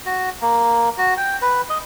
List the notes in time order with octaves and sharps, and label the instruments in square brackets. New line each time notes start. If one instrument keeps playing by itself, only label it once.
[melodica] F#4
A#3
F#4
G5
B4
D#5